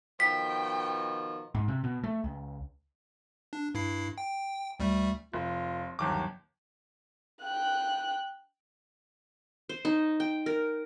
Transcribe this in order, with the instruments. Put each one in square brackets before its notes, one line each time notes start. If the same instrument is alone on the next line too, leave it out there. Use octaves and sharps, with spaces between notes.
[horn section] B2 D#3 F3 [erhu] G5 [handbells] B6
[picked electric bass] G#2
C3
B2
A3
C#2
[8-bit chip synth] D4
G2 E4 C7
G5
D2 G3 A3
[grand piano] F1 [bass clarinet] F4
[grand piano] G1 D#2 D6 [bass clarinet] F#3
[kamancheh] G5 F#6
[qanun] C5
D#4
G5
A#4